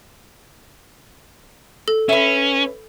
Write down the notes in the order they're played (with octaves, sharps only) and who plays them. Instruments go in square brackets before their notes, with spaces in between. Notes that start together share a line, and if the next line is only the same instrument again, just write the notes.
[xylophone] A4
[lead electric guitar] C#4 [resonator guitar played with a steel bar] B4 E5